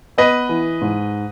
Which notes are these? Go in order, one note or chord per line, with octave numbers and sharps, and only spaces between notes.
B3 B4 D#5
E3
G#2